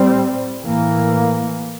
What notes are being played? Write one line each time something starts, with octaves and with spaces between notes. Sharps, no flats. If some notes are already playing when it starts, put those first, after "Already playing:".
Already playing: A2 G3 C4
A2 E3 A#3